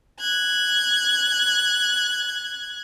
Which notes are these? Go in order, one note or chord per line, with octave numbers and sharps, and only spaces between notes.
F#6 G#6